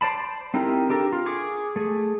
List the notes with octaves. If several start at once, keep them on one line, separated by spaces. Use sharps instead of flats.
C5 D5 A5 B5
C4 D#4 E4 G4 A#4
D4 G4 A4 A#4
F4
G#4 C#6 D6
A3 G#4